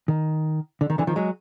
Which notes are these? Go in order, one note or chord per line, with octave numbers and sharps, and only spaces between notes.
D#3
D3
D#3
D3 E3
D#3 F3
F#3 G#3